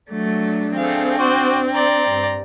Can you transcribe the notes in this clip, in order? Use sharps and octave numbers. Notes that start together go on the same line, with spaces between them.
F#3 A3 D4
A3 C4 G#4 F5
F#4 C5 D5
D5 A#5 C6
G2